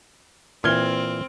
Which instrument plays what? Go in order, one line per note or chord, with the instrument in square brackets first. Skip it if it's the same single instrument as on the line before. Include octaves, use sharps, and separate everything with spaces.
[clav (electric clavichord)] A#2 E3 [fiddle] C4 [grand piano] F6 G#6 G7